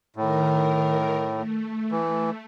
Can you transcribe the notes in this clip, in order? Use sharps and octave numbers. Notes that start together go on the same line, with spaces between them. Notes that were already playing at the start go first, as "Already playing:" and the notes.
A2 D#3 A#4
A3
E3